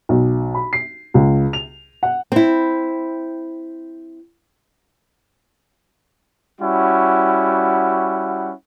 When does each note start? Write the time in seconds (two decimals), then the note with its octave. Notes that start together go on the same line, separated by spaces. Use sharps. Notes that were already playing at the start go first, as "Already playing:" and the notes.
0.09 B1
0.55 B5
0.73 C7
1.14 C#2
1.53 F7
2.03 F#5
2.32 C4 E4
6.61 G3 C#4 E4 F#4 F#5